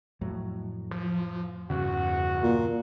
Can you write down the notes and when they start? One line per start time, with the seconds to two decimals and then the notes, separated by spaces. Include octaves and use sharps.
0.21 F2 A2 F#3
0.91 F3
1.70 E2 G2 C#3 F#4
2.43 A#2